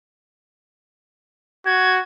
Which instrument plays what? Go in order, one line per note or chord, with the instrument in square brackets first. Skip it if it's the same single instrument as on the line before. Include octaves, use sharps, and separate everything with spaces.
[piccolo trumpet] F#4 [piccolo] G#6